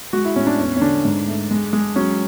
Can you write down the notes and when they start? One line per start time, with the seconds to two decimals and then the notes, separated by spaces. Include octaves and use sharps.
0.13 G#3 F#4
0.25 E4
0.36 A2 C#4
0.47 D4
0.59 E2 C#4
0.76 C#4
0.81 D3 D4
1.05 G#2
1.28 A3
1.51 G#3
1.73 G#3
1.96 F#3 C#4